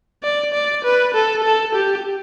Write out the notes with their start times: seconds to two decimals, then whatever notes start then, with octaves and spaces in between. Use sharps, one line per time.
0.23 D5
0.53 D5
0.84 B4
1.14 A4
1.44 A4
1.75 G4